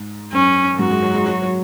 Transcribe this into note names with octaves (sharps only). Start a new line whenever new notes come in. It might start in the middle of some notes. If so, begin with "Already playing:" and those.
Already playing: G#2
F#2 C#4
F#2
G#2 F#4
G#3
F#3
G#3
F#3
F#3